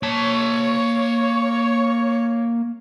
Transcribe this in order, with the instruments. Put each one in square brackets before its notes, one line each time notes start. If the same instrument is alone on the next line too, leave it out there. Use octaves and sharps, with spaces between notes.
[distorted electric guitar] A#3 A5 [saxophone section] C#5